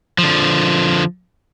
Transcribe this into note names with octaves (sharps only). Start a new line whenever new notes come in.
D3 F3